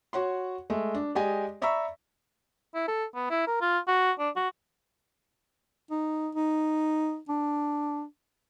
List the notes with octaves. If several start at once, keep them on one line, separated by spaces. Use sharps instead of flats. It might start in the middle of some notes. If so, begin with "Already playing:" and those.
F#4 C#5 F#5 C6
G#3 A3
D4
G#3 G4 D5 D#5 G#5
D5 E5 A#5 B5 C#6 E6
E4
A4
B3
E4
A#4
F4
F#4
D4
F#4
D#4
D#4
D4